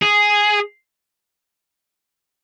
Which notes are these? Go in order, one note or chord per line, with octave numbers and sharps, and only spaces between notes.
G#4